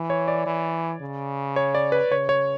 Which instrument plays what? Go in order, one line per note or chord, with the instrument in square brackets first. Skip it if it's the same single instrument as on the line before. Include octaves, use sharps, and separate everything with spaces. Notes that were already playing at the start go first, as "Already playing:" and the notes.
Already playing: [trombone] E3
[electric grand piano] C#5
D5
[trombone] E3
C#3
[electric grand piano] C#5
D5
B4
[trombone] C#3 [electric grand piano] C#5
[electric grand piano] C#5